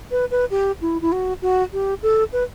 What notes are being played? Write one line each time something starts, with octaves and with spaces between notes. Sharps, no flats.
B4
B4
G4
E4
E4
F#4
F#4
G4
A4
B4